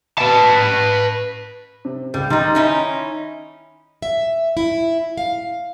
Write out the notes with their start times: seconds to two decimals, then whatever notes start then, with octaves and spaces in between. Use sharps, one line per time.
0.18 B4 A5
1.85 C3
2.14 C#2 G3
2.30 D#3 G3 D#4 A#5 C6
2.55 C#4 D#4 E4
4.02 E5
4.57 E4
5.17 F5